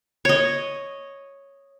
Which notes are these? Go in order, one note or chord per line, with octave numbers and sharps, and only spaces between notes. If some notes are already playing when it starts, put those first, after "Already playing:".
C#5 D#5